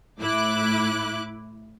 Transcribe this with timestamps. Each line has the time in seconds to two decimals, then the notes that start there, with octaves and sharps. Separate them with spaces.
0.20 A2 E4 D6 F#6